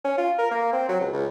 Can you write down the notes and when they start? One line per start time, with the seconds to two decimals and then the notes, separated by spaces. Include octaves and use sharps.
0.04 C#4
0.18 F4
0.38 A#4
0.51 A#3
0.72 C4
0.89 F#3
1.01 C#2
1.13 C#2